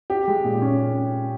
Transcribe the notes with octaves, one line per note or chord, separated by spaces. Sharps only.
G4
G#3
A#2
C#4